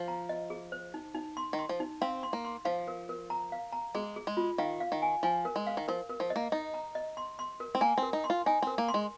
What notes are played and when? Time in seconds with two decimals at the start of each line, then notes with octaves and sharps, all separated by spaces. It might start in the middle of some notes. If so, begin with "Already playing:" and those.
Already playing: F3
0.08 A#5
0.29 D#5
0.50 G#4
0.72 C5
0.94 D#4
1.15 D#4
1.37 C6
1.53 D#3
1.59 C6
1.69 F3
1.80 D#4
2.02 C4 F5
2.23 C6
2.33 A#3
2.45 C6
2.65 F3 F5
2.88 A#4
3.09 A#4
3.30 A#5
3.52 F5
3.73 A#5
3.95 G#3 G#4
4.16 G#4
4.27 G#3
4.37 F4
4.58 D#3 F5
4.80 F5
4.92 D#3
5.02 G#5
5.23 F3 G#5
5.45 A#4
5.56 G#3
5.67 F5
5.77 D#3
5.88 F3 A#4
6.09 A#4
6.20 F3
6.30 D#5
6.36 A#3
6.52 D#4 D#5
6.74 A#5
6.95 D#5
7.17 C6
7.39 C6
7.60 A#4
7.75 C4
7.81 A#3 G#5
7.98 C4
8.03 A#4
8.13 D#4
8.24 C6
8.30 F4
8.46 D#4 G#5
8.62 C4 A#4
8.78 A#3
8.88 C6
8.94 G#3